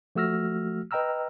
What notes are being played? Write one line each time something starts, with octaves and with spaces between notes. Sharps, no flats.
F3 A3 F#4 E6 F6 A#6
B4 D#5 G5 A#5 E6 F6